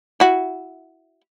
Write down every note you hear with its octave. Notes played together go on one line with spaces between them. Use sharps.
E4 F#4